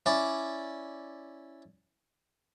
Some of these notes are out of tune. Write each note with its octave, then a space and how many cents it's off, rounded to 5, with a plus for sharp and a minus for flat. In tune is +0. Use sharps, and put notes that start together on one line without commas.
C#4 +0 E4 +0 D5 +0